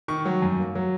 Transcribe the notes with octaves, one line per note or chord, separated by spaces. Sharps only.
D#3 C#6
F#3
F#2
A#3
F#3